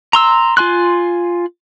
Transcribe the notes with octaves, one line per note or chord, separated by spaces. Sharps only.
A#5 C6 E6
F4 G#5 C6 F#6